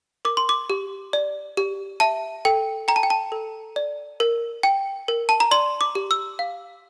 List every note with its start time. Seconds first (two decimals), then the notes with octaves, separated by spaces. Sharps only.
0.25 A#4 D6
0.37 C6
0.49 D6
0.70 G4
1.13 D5
1.57 G4
2.00 E5 A5
2.45 A4 G5
2.88 G5 A#5
2.96 A5
3.03 G5
3.10 A5
3.32 A4
3.76 D5
4.20 A#4
4.63 G5
5.08 A#4
5.29 A5
5.40 A#5
5.51 D5 C6
5.81 D6
5.95 G4
6.11 E6
6.39 F5